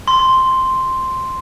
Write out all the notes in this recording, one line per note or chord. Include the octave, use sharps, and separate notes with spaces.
C6